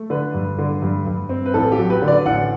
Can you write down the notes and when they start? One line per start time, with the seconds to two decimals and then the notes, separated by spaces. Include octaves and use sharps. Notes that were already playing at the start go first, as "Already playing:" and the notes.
Already playing: A3
0.10 D3 B4
0.34 G2
0.58 D3
0.82 G2
1.06 G2
1.29 C4
1.46 B4
1.54 A1 A4
1.72 G4
1.78 F#3
1.90 B4
2.02 D3
2.08 D5
2.26 A1 F#5